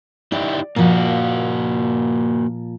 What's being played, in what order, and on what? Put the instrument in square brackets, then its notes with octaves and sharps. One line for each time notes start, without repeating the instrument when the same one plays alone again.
[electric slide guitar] D#4 E4 G4 [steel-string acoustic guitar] D5
[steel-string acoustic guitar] A#2 F3 [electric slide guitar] A#3 F#4